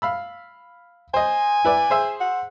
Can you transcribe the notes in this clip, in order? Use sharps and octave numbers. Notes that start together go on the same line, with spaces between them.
F5 B5 E6
C5 D#5 G#5
E4 B4 D5
G#4 C5 E5
F#5